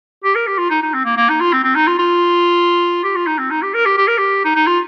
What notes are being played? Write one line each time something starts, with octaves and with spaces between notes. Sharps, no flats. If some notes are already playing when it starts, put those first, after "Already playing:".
G4
A#4
G4
F4
D#4
D#4
C4
A#3
A#3
D#4
F4
C4
C4
D#4
F4
F4
G4
F4
D#4
C4
D#4
G4
A#4
G4
G4
A#4
G4
D#4
D#4
F4